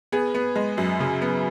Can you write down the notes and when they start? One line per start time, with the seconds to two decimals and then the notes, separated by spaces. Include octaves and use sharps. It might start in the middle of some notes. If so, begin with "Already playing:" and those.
0.12 B3 G#4
0.34 B3
0.56 G#3
0.78 F#2
1.00 C#3
1.22 B3